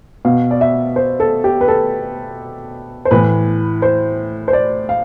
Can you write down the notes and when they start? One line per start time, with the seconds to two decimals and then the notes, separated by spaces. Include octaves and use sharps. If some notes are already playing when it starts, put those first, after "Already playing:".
0.25 B2 F5
0.51 D5
0.61 E5
0.96 C5
1.20 A4
1.44 G4
1.61 B4
1.68 A4
3.05 C5
3.11 A2 E3 B4
3.82 C5
4.48 C5
4.53 D5
4.89 F5